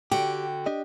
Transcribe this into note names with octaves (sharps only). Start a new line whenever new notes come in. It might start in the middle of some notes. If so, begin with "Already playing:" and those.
D3 F#4 G4 G5
D4 G4 D#5